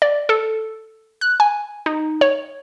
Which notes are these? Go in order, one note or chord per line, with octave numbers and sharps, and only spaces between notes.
D5
A4
F#6
G#5
D#4
C#5